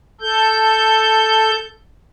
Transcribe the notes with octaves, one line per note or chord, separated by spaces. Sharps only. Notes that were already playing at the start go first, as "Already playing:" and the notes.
A4 G6